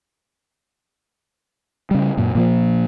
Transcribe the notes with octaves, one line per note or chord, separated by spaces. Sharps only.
C#3 G3
F#2 A#2
A#2 F3 A#3